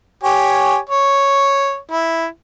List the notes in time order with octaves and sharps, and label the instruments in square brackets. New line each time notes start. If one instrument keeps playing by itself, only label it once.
[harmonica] G4 C#5 G#5
C#5
E4